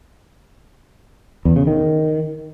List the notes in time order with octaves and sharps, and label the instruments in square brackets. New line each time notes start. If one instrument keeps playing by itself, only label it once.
[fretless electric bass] E2
C#3
D#3